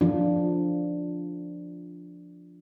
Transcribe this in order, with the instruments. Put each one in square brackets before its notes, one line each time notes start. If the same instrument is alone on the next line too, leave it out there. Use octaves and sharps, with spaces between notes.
[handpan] F3 D4 F4